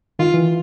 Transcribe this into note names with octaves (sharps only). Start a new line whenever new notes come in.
D#3 F4
E3